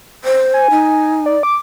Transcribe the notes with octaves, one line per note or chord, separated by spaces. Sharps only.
C5
G#5
D#4
D5
D6